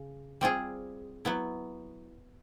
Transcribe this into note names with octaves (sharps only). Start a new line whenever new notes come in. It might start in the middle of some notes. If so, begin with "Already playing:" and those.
Already playing: C#3
G3 C4 F4 G#4
F#3 B3 E4